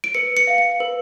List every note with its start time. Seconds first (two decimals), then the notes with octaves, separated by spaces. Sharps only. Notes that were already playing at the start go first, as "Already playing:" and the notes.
0.04 D7
0.15 B4 C#7
0.37 C#7
0.47 F5
0.58 C#7
0.80 B4